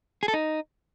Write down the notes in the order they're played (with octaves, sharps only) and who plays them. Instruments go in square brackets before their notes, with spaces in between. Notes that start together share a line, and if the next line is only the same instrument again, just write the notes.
[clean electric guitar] G#4
A4
D#4